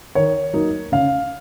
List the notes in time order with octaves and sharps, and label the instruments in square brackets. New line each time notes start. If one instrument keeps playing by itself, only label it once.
[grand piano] D#3 C#5
F#3 A#3 D#4
C#3 F5